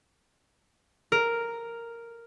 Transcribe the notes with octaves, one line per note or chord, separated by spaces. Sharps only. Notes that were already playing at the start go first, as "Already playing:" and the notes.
A#4